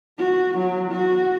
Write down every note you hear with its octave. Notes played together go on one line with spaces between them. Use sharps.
F#4
F#3
F#4